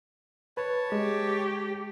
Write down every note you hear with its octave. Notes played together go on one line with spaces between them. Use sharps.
B4 C#5 A5
G#3 G4